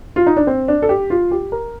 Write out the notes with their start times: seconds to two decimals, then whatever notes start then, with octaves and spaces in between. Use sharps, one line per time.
0.16 F4
0.26 D#4
0.37 D4
0.47 C4
0.68 D4
0.82 A4
0.89 G4
1.10 F4
1.31 G4
1.52 A#4